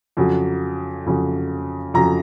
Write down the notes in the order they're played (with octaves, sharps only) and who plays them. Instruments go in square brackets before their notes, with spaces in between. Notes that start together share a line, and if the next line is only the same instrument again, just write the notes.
[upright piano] F2 C#3 F#3
F2 C#3 F#3
F2 C#3 F#3 A#5